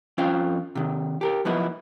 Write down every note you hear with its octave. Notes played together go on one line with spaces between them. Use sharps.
F2 C#4 F4 C5 F5 G5
C3 D#3
G4 A4 A#4
F3 F#3 B3 D#4 E4